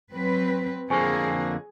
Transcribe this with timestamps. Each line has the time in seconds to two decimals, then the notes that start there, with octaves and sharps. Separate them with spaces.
0.13 F#3 C4 B4
0.90 F2 D3 A#3 G#4 C5 G#5 C#6